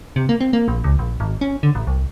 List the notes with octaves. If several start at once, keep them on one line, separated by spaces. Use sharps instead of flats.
C3
A#3
C4
A#3
A#1
C#2
A#1
G#1
C#4
D3
A1
C2